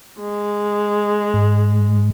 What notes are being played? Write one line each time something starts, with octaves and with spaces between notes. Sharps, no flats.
G#3
G#2